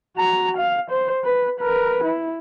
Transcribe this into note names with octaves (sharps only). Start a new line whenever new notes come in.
F#4 A#5
F5
C5
B4
A#4 B4
E4